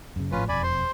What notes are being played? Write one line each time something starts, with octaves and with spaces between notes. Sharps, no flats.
F#2 C#3
G#1 A2 F3 C#4 F4 B4
E1 F2 D5 G#5 B5
C5 C6